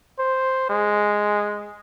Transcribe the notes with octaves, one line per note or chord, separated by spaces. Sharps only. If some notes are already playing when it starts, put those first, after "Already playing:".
C5
G#3